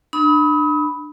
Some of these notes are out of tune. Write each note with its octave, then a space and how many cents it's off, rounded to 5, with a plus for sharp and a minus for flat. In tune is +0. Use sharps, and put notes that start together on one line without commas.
D4 +25 B5 +0 D#6 +40